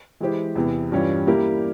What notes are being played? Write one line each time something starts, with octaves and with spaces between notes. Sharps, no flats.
E3 G#3 E4 G4 C5
E2 C3 E3
G2 E3 G3 C#4 F4
G3 A#3 E4 G4 A#4